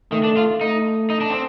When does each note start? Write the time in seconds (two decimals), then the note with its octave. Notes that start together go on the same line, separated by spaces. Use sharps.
0.12 D#3 A3
0.24 D4
0.37 F4
0.61 A3 D#4
1.10 D#4
1.21 D4
1.30 C4